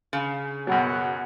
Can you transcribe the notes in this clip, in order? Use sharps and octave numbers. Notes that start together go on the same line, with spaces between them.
C#3
F#2 B2 F#3 F#5